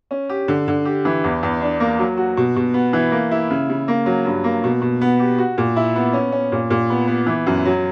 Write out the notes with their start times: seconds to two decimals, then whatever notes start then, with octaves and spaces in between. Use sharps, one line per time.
0.11 C#4
0.29 G4
0.48 D3
0.68 D3
0.85 G4
1.05 E3
1.24 E2
1.43 E2
1.61 D4
1.80 A#3
1.99 F#3
2.17 F#4
2.37 B2
2.56 B2
2.74 B3
2.93 E3
3.12 A#3
3.31 E4
3.50 C#3
3.69 C#3
3.88 A#3
4.06 F#3
4.25 G2
4.44 A#3
4.64 B2
4.82 B2
5.01 B3
5.20 G4
5.38 F#4
5.58 A#2
5.76 E4
5.96 B3
6.13 C#4
6.32 C#4
6.52 A#2
6.70 A#2
6.90 B3
7.08 B3
7.26 E3
7.47 F#2
7.65 F#3